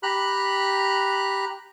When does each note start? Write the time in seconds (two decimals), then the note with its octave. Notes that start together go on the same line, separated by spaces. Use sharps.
0.03 G4 A#5 B5 F#6